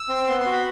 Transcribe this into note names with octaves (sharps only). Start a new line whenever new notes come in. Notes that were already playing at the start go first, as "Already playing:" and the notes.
Already playing: E6
C4
B3 C6
C6
F#4
B5